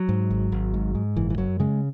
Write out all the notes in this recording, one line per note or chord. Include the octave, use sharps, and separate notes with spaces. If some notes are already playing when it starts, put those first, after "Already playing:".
Already playing: F#3
G#2
G#1
G#1
G#2
G#2
F#1 E3
E3
F#2 F#3
C#3 G#3